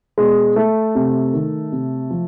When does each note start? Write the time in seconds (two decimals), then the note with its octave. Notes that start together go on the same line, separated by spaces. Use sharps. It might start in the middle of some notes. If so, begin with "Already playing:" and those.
0.18 B2 G#3
0.56 A3
0.95 C3
1.33 D#3
1.72 C3
2.10 F3